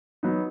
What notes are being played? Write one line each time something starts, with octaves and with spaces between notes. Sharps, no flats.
F#3 B3 D#4